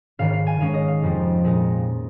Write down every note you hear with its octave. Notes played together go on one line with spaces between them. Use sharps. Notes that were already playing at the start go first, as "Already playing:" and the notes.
G#1 G#2 D#3 F5
F5
G#5
G#2 D#3 G#3 C#4 F5
D#5
F5
F1 F2 F3
A#2 G#3 D#4